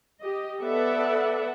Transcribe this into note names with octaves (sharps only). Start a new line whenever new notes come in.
G4 D#5
B3 A4 B4 D5 E5 F#5